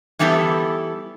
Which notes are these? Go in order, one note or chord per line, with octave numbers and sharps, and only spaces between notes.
E3 G3 B3 E4 A4